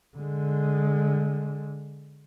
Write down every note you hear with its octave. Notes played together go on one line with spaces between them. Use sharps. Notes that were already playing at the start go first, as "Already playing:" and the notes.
D3 G#3